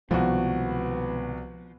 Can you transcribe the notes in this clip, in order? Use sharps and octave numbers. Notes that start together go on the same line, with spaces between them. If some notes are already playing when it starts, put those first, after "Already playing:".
C2 B2 D#3 F3 G#3 B3 F#4